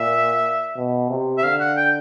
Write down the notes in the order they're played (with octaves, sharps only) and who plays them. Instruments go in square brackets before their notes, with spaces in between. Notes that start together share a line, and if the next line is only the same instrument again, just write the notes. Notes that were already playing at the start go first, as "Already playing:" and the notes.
Already playing: [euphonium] A#2 [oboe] E5
[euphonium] B2
C3
[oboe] E5
[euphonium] D3 [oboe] F5
[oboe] F#5
G5